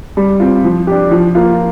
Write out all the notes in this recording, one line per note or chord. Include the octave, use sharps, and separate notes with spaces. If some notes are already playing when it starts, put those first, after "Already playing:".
G3
C4 F4
F3
D4 G4
F3
A#3 F4